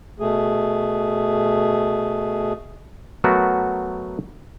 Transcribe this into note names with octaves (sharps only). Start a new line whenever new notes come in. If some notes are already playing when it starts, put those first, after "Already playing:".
B2 A3 G#4
F#3 A3 B3 F#4 A#4